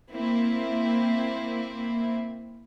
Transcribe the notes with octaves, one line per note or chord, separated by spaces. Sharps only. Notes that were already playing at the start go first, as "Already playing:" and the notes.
A#3 C4 E4